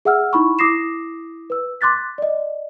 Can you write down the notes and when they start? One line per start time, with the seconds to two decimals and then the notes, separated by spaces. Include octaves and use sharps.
0.05 G#4 E5 F#5 E6 F6
0.33 D#4 E4 B5 C#6
0.59 E4 D6 D#6 A#6 C7 E7
1.50 B4 E6
1.81 C6 D6 F#6 A6 B6
2.18 D5 D#5